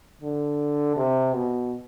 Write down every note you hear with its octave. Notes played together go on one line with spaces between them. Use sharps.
D3
C3
B2